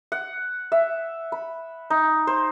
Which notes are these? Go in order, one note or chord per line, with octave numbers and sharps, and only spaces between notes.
F#5
E5
B5
D#4
C5